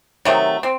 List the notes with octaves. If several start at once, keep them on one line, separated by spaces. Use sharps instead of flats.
C3 D#3 F#3 A3
C4